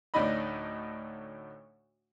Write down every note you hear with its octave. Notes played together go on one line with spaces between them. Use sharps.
D2 A2 D4 D#4 D#5 B5